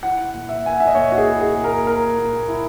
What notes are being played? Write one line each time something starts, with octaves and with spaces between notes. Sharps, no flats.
E4 F#5
A#2
E5
A#3 G#5
F#5
E5
D#5
A#2 C#5
F#4
G#4
E4
G#4
A#2
A#4
A#3 A#4
A#2
E4